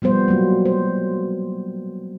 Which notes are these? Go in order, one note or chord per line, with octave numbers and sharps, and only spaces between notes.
F3 G3 B3 C5
F#3 A#3
C5